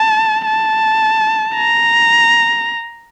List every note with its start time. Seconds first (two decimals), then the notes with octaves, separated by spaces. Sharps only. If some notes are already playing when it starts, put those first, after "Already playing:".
Already playing: A5
0.46 A5
1.56 A#5